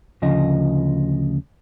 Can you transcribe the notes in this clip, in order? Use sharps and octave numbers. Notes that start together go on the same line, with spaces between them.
D2 C#3 F3 D#5